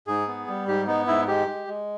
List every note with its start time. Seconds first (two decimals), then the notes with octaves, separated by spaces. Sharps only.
0.07 G#2 G#4
0.27 B3
0.48 G3
0.68 G#2 G4
0.87 B3 D#4
1.07 G#2 E4
1.28 G#3 G4
1.47 G#3
1.68 G#3